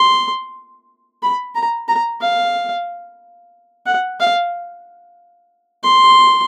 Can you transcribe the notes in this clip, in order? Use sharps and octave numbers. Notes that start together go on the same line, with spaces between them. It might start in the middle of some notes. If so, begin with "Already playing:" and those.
Already playing: C6
B5
A#5
A#5
F5
F#5
F5
C6